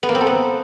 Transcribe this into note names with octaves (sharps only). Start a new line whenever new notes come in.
B3
A#3
C4
A4
B3